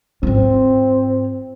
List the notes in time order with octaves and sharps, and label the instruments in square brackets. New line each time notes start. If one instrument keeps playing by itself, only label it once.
[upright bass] G#2 F4 [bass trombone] C4